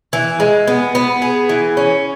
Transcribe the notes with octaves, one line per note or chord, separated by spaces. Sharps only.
E3
G#3
B3
B3
G#4
E3
C#4